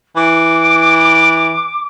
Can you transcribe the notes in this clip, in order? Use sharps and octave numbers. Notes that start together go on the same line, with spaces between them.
E3 D6